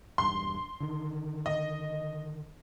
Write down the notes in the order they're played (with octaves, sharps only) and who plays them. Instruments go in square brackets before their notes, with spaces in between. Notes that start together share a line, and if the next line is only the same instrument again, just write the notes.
[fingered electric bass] E1 G2 [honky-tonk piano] C6
[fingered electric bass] D3 D#3
[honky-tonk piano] D#5